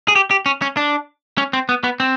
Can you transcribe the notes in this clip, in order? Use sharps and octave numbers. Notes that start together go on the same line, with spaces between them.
G#4
G4
G4
C#4
C#4
D4
C#4
C4
B3
B3
C4